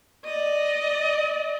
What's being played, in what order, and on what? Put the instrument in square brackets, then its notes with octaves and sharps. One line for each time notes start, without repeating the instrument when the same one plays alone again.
[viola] D5 D#5